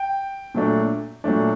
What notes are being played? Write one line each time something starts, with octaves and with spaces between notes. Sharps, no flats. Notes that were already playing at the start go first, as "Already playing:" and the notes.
Already playing: G5
A#2 F#3 A3 D4
A#2 F#3 A3 D4